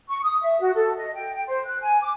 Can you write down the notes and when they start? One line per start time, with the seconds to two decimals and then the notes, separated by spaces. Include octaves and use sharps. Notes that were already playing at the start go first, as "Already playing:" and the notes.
0.09 C#6
0.24 D#6
0.42 E5
0.60 F#4
0.74 A4
0.98 D#5
1.14 G5
1.33 G5
1.47 C5
1.66 F#6
1.81 G#5
2.02 D6